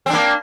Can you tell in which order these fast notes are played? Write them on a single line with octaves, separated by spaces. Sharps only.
C4 D4 A#3